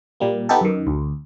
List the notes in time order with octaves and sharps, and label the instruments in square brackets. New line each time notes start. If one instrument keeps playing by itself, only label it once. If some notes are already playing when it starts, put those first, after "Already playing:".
[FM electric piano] A#2 G3 A#3
B3 D#4 G4 A4
F#2 D#3
D2